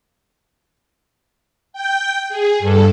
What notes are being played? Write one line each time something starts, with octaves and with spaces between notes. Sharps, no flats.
G5 G6
G#4
G2 A4